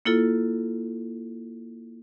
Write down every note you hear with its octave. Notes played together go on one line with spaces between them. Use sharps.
A#3 E4 F4 A4